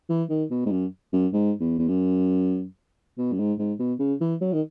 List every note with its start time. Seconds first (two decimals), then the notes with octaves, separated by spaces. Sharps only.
0.09 E3
0.30 D#3
0.51 B2
0.66 G#2
0.71 F#2
1.13 F#2
1.33 G#2
1.60 E2
1.78 E2
1.88 F#2
3.18 B2
3.33 F#2
3.39 G#2
3.59 G#2
3.79 B2
4.00 C#3
4.21 E3
4.41 F#3
4.53 D#3